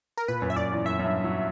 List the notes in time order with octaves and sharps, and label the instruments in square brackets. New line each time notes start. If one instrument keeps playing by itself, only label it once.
[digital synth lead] A#4
[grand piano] A#2 [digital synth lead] B4
[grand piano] F#2
[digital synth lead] E5
[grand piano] F#2 [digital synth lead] D5
[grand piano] E2
[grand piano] F#2 [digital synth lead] E5
[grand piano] F#2
G2
F#3